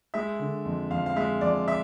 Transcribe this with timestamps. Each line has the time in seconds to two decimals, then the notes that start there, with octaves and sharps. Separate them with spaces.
0.14 G#3 E5
0.40 D3
0.65 F2
0.90 F2 F5
1.06 F5
1.16 G#3 E5
1.41 F2 D5
1.68 E5